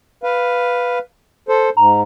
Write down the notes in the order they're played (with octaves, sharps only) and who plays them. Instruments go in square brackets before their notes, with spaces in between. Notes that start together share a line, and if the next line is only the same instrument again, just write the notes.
[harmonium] B4 F5
A4 C5
[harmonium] G#2 [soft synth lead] A#5